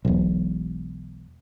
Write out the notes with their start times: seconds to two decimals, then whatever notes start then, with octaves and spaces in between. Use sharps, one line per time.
0.05 E1 B1